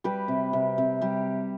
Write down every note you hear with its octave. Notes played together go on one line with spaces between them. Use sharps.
G3 G4 B4
C3
C3
C3
G3 G4